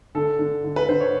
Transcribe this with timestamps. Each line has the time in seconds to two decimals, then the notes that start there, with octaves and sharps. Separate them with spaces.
0.15 D3 A4
0.39 D3
0.65 D3
0.76 B4
0.89 D3 C5
1.01 C#5